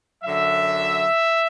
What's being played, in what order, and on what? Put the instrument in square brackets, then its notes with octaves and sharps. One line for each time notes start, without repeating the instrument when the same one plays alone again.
[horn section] F#2 D3 F#3 E5